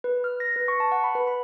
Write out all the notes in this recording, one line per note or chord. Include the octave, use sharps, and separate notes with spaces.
B4
F6
A#6
B4
C#6
A5
F#5
B5
B4
B5